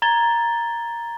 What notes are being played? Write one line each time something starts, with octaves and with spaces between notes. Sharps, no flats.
A#5 G#6 A6 G7